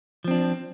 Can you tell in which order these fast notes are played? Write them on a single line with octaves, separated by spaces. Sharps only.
F3 C4 D4